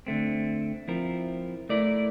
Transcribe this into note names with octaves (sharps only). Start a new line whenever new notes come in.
D3 A3 C4
F3 C4 E4 A#4
A3 E4 A#4 D5